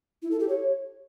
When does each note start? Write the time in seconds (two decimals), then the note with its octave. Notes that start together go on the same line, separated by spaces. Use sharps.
0.22 E4
0.31 A4
0.40 G4
0.49 C#5